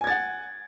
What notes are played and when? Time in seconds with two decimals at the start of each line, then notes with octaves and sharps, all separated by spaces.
0.01 G#5
0.04 G#6
0.07 A6
0.10 F#5